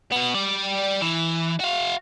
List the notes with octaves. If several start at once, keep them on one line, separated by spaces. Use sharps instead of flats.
B2 B3
G3 D5
E3
F#4 F5